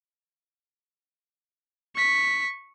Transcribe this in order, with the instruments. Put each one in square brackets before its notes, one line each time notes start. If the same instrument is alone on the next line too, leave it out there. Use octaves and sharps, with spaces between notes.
[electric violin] C#6 B6